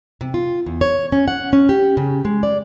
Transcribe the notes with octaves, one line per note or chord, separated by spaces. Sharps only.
C3
F4
E2
C#5
C#4
F#5
C#4
G4
C#3
G#3
D5